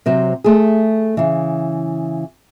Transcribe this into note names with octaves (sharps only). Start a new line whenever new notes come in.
C3 F#3 C5
A3 G#4
C#3 E3